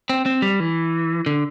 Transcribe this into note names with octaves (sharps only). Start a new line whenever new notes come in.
C4
C4
G3
E3
D3